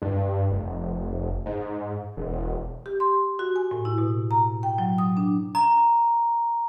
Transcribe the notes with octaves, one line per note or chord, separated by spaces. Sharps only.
G2
F1
G#2
E1
G4
C6
F#4
G#5
A2
E4
B2
A#5
G5
F#3
D#6
D4
A#5